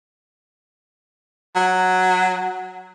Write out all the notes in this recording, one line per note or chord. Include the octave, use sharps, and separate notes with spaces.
F#3